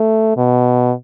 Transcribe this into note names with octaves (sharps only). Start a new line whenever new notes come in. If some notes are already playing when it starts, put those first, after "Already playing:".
Already playing: A3
B2